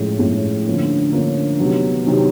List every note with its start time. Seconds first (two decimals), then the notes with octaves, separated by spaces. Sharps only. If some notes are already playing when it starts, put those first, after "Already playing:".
Already playing: A2 F3 G#3 C#4
0.19 A2 F3 G#3 C#4
0.66 D3 F3 A#3 C#4
1.12 D3 F3 A#3 C#4
1.59 C3 D#3 F#3 B3
2.06 C3 D#3 F#3 B3